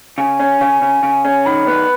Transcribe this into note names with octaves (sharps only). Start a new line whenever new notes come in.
C#3 G#5
C#4
C#3
C#3
C#3
C#4
D#3 B5
B3